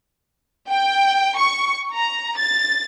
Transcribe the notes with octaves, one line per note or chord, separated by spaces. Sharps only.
G5
C#6
A#5
A6